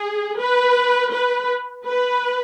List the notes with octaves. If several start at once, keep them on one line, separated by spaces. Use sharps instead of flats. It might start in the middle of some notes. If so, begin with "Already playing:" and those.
Already playing: G#4
B4
B4
B4